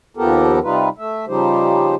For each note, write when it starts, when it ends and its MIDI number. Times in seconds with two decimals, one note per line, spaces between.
0.17 0.59 39
0.17 0.59 53
0.17 0.59 59
0.17 0.59 67
0.17 0.59 69
0.17 0.59 70
0.63 0.89 48
0.63 0.89 55
0.63 0.89 63
0.63 0.89 65
0.63 0.89 71
0.98 1.25 57
0.98 1.25 76
1.28 1.95 49
1.28 1.95 53
1.28 1.95 55
1.28 1.95 63
1.28 1.95 67
1.28 1.95 72